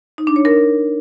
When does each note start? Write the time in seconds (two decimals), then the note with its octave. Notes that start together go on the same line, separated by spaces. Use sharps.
0.18 D#4
0.27 D4
0.36 C#5
0.45 A#4